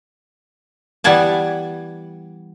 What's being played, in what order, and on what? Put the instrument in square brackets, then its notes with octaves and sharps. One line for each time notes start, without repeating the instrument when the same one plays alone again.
[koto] E3 G3 B3 F#5 G#5 A5